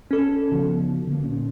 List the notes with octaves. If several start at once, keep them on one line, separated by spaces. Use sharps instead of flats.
C#4 A4
B1 C#3 F3 B3
D3 A#3
A#1 A#2 C#4